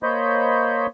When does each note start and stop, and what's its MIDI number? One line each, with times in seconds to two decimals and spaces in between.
0.03 0.87 58
0.03 0.87 72
0.03 0.87 73
0.03 0.87 75
0.03 0.87 83
0.03 0.87 91